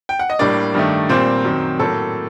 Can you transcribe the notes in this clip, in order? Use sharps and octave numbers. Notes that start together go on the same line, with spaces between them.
G5
F#5
D#5
A2 G3 A#3 D4 D5
G2 D#3 A3
A#2 G3 A#3 C4 C5
F#2 D#3 F#3
A2 F#3 A#3 A4